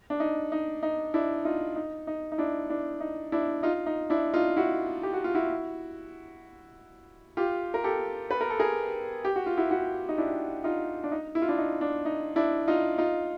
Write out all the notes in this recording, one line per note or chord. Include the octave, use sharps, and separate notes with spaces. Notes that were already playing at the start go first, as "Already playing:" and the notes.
D4
D#4
D#4
D#4
D4 E4
D#4 F4
D#4
D#4
D#4
D4 E4
D4 E4
D#4
D4 E4
D#4 F4
D#4
D4 E4
D#4 F4
E4 F#4
G4
F#4
F4
E4 F#4
F4 G4
A#4
G4 A4
B4
A#4
A4
G#4 A#4
G4
F#4
F4
E4 F#4
E4 F#4
D#4
D4 E4
D#4 F4
D4
D#4
E4
F4
D4 E4
D#4
D4
D#4
D4 E4
D#4 F4
D#4 F4